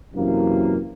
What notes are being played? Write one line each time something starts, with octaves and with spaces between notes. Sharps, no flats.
F#2 C3 E3 A#3